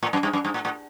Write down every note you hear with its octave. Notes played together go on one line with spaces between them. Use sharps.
A2
F#2
G2
F#2
G2
A2
A2